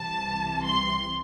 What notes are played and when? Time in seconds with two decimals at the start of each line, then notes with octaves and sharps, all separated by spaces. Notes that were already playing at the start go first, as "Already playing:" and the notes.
Already playing: C2 C3 E3 A5
0.64 C6